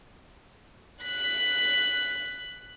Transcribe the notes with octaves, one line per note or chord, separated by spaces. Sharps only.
F#6 B6